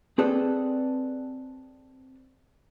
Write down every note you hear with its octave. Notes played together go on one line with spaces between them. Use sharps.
C4 G#4 A4 B4 D5